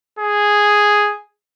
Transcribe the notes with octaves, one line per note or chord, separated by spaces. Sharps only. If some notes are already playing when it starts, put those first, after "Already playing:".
G#4